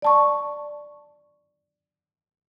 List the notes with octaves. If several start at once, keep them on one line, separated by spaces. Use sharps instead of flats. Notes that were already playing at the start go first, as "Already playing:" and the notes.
D5 A5 C#6